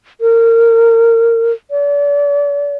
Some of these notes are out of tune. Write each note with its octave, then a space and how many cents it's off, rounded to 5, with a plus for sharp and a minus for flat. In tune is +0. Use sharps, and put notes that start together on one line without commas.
A#4 -25
D5 -40